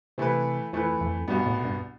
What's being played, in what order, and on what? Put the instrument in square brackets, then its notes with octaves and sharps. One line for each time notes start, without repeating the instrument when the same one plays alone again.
[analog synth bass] C3 [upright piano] E3 A3 E4 B4
[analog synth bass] F2 [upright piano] E3 A3 E4 B4
[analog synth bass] F2
[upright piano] C2 B2 B3 [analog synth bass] G2
[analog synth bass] A2
G2